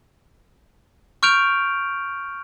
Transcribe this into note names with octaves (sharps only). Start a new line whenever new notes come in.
C#6 F6 G6 D7 F7